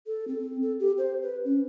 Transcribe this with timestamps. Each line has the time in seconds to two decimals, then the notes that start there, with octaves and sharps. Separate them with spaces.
0.06 A4
0.28 C4
0.62 A4
0.80 G4
0.98 C5
1.22 B4
1.45 C#4